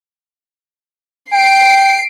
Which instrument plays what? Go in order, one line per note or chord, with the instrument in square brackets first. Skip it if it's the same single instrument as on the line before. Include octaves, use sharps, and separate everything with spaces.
[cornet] G5 [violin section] C7 D7